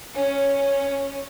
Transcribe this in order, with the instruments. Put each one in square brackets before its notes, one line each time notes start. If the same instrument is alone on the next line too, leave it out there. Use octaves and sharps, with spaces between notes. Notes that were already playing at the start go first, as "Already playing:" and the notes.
[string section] C#4